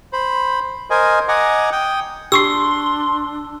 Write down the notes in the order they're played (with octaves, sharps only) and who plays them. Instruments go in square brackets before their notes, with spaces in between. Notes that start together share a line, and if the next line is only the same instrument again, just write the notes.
[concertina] C5 B5
A#4 C5 D#5 G#5
D#5 F#5 G#5 A#5 D6
G5 D#6
[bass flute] D4 [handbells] G4 C#6 C7 [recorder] C6 [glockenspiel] E6